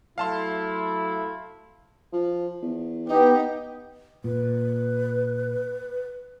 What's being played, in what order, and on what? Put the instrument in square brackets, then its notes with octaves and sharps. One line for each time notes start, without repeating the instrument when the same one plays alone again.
[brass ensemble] F#3 A3 E4 [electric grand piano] F5 A5 C6
[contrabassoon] F3
E2
[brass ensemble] B3 G4 [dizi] D#4
[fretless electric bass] A#2 [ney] B4